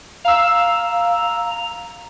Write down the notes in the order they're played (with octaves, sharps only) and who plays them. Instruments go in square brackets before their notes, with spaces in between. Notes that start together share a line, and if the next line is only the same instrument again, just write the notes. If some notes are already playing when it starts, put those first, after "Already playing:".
[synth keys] F5 E6 [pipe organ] A#5